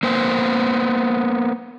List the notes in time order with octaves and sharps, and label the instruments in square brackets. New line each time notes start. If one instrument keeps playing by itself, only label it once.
[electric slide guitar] A#3 B3 C5